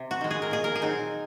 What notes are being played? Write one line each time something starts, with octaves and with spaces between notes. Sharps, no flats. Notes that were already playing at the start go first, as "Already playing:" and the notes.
Already playing: C3
F#4
D#3 G#3
G#4
A#4
A#2 G#4
A#4
G#4
F#3 C4 D#4